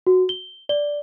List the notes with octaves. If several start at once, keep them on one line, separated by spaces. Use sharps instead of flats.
F#4
G7
D5 G7